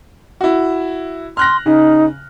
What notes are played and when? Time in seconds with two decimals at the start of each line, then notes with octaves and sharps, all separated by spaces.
0.41 E4 F#4
1.37 C6 F6 F#6 A#6
1.66 C#3 D#4